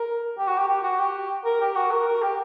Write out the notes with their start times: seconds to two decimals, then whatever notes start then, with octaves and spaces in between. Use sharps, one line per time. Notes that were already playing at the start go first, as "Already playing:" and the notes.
Already playing: A#4
0.38 G4
0.48 F#4
0.58 G4
0.68 G4
0.83 F#4
0.99 G4
1.45 A#4
1.60 G4
1.76 F#4
1.91 A#4
2.07 A#4
2.22 G4